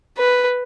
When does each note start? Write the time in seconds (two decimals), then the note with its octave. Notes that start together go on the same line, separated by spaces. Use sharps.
0.18 B4